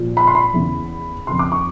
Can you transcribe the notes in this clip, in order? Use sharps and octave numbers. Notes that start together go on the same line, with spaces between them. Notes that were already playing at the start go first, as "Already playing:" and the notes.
Already playing: A#2 F3
B5
C6
B5
E2 C#3 E3
F2 C#3 F3 C6
D6
C#6